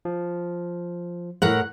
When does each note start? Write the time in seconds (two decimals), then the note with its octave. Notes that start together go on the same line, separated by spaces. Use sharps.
0.05 F3
1.42 A2 A#4 F#5 F#6